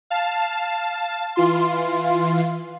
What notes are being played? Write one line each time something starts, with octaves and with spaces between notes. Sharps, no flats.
F5 A5
E3 F4 C6